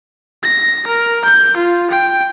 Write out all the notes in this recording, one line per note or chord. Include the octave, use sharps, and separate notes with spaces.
A#6
A#4
G6
F4
G5